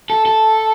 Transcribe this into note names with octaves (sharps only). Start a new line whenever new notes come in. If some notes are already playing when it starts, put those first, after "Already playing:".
A4
A4